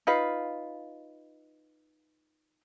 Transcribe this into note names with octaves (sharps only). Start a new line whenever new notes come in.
D#4 F4 B4 F5